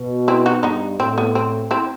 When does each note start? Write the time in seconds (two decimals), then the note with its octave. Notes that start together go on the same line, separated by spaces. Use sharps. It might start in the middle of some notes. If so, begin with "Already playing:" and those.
Already playing: B2
0.28 C4 E4
0.46 D#4 F#4
0.63 G2 B3 D#4
1.00 A2 C4
1.18 B3
1.35 C4
1.71 C4 E4